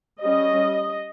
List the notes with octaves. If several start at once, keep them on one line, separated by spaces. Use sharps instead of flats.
G3 C#4 D#5